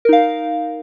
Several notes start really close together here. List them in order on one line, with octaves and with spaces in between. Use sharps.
A#4 D#4 F5